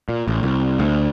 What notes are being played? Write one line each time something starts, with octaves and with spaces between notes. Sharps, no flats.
A#2
A1
C2
D2